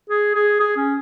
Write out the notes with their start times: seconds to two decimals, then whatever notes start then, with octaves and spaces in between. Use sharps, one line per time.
0.10 G#4
0.35 G#4
0.60 G#4
0.77 C#4